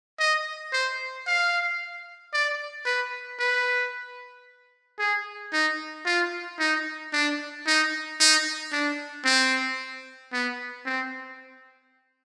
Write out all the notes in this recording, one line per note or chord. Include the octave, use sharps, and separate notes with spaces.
D#5
C5
F5
D5
B4
B4
G#4
D#4
F4
D#4
D4
D#4
D#4
D4
C4
B3
C4